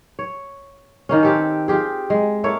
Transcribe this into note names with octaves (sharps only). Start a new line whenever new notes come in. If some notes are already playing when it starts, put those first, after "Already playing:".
C#5
D#3 A#3 C#4
C4 G4 A4
F4 G4 G#4
G#3
A#3 E4 A4 C#5